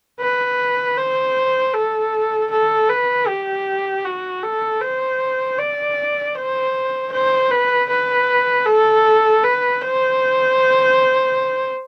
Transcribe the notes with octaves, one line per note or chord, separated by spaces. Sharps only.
B4
C5
A4
A4
B4
G4
F#4
A4
C5
D5
C5
C5
B4
B4
A4
B4
C5